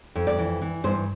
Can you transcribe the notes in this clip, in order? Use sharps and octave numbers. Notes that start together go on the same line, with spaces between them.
F2
D5
E3
E3
G2 C5